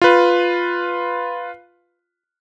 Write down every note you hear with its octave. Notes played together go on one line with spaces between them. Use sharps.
F4 B4